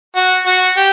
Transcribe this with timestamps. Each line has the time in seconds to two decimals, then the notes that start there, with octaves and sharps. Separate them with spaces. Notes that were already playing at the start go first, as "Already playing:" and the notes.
0.16 F#4
0.46 F#4
0.77 G4